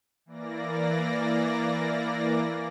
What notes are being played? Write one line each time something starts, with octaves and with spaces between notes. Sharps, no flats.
E3 A#3 D5 A#6